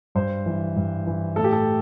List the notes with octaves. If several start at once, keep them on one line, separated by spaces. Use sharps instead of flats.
G2 C5
E3
G2
E3
A2 A4
G4
A4